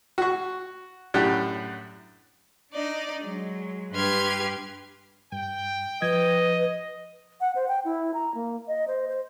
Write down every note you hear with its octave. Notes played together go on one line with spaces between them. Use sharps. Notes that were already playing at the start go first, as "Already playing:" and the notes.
F#4 C#6
F#2 A2 D4 G4 F#5
D4 D#4 D5 D#5
F#3 G#3
G2 G4 B4 C6 F6 G#6
G2 G5
F3 B4 D#5 G#6
F#5
C5
G5
E4
A#5
A#3
D#5
C5
C5